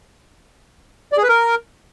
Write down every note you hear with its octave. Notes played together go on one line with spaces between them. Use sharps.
D5
G#4
B4
A#4